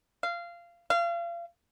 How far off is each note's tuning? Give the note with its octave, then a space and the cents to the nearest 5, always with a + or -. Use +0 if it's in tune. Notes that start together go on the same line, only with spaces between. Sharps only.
F5 -20
F5 -35